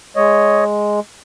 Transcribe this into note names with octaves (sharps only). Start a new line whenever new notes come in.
G#3 C#5 D#5